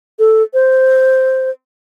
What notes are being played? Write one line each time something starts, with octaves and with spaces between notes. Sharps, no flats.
A4
C5